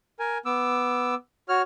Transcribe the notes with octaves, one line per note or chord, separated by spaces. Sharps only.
A#4 G#5
B3 D6 E6
F#4 C#5 F6